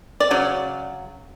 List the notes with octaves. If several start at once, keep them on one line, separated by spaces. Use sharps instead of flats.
D5
C#3 F#3